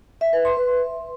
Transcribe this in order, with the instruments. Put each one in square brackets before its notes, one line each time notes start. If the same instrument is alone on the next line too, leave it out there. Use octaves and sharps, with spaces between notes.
[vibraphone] E5
B4
C6
B4